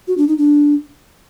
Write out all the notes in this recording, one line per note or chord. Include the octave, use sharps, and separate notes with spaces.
F#4
D4
D#4
D4